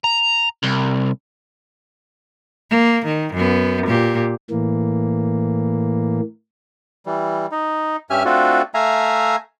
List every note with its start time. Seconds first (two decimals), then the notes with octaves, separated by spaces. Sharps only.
0.04 A#5
0.63 C2
2.70 A#3
3.06 D#3
3.34 F#2 B3
3.87 A#2 G4
4.50 A2 E3 A#3
7.06 E3 G3
7.52 D#4
8.10 G2 C#4 G4 E5 G#5 F6
8.25 A3 C4 D4 F4 F#4 A4
8.74 A3 E5 F5 G#5 A#5